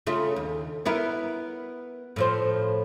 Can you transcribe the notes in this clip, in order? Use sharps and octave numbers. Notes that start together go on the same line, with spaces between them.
C#3 A3 F4
D#2
B3 E4 A#4
A2 F3 C5